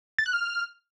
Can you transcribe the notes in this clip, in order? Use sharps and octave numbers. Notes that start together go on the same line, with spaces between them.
A6
F#6
F6